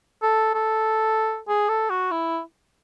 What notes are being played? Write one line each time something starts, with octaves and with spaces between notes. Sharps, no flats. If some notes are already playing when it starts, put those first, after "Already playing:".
A4
A4
G#4
A4
F#4
E4